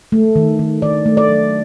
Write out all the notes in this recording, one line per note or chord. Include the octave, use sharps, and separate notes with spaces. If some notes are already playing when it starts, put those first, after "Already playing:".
A3
D#3
D#3
D#3 D5
A3
D5
F#3